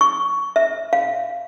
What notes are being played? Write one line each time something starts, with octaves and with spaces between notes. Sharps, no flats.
C#6
E5
F5